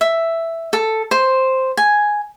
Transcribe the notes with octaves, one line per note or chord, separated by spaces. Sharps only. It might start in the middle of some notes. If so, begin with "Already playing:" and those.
E5
A4
C5
G#5